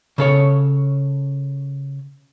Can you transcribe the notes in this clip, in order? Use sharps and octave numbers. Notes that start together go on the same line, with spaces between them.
C#3 A4 C#5